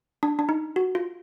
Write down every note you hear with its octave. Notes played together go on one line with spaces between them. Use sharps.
D4
D4
D#4
F#4
F4